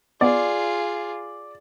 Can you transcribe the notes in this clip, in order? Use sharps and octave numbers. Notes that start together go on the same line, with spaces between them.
B3 F4 G#4 D5 D6